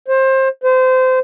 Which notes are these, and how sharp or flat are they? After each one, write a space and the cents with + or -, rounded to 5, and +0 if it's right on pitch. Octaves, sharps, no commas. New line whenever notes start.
C5 +25
C5 -25